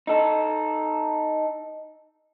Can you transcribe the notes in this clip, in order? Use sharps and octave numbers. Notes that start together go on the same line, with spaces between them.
D#4 A4